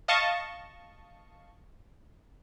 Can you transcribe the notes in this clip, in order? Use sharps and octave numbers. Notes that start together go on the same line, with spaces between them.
D#5 F5 A5 C#6